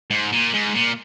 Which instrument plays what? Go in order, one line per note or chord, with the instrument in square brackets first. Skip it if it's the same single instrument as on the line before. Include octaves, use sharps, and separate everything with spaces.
[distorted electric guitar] G#2
A#2
G#2
A#2